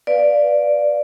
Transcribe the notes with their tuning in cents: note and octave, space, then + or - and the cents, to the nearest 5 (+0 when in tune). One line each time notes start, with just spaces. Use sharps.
B4 +0 D5 +0 F5 +0